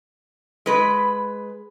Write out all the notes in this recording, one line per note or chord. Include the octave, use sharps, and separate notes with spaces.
G#3 B4